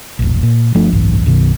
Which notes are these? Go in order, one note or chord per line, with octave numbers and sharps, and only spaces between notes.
E1 A#1
A#2
G1 F3 A3 D4
F#1 B1 G#2 E3
B1 F#2 B2 D#3